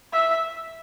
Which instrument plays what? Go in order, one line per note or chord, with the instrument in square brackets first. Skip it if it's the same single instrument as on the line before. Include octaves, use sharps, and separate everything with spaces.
[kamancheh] E5